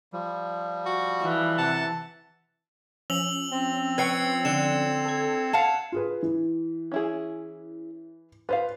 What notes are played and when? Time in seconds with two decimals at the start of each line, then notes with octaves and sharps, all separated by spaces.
0.13 F3 G3
0.86 F#4
1.22 E3
1.58 C3 F#5 A5
3.10 F3 C#4 E6 F7 F#7
3.52 C4
3.98 B4 C#5 G5 G#6 C7 C#7
4.45 D3 E7
5.05 A4 G#6
5.53 F5 F#5 A5
5.92 F4 G#4 B4
6.23 E3
6.92 C#4 E4 G#4
8.49 F4 B4 C5 F5